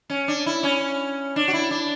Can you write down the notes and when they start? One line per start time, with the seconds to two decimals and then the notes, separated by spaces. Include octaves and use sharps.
0.10 C#4
0.28 D4
0.46 E4
0.63 C#4
1.36 D4
1.48 F#4
1.53 E4
1.71 D4